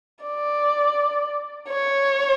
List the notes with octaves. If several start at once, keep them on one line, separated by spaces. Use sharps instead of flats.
D5
C#5